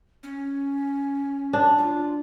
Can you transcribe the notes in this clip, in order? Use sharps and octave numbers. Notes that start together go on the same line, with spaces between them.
C#4
D4
F4